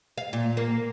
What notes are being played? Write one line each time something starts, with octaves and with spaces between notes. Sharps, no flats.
F5
A#2
A#3